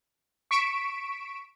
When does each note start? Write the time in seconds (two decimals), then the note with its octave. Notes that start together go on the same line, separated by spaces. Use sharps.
0.51 C#6 B6 D7 E7